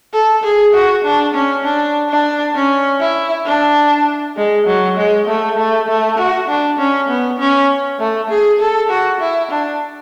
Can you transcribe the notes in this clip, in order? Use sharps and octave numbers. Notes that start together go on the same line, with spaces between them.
A4
G#4
F#4
D4
C#4
D4
D4
C#4
E4
D4
G#3
F#3
G#3
A3
A3
A3
F#4
D4
C#4
B3
C#4
A3
G#4
A4
F#4
E4
D4